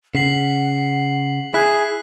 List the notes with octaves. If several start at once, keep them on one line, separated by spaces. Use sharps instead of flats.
C#3 F#5 B6 C7 F#7
E4 G#4 F#6 B6